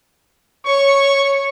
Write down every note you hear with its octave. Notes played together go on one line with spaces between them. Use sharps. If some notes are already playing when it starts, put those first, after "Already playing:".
C#5 C#6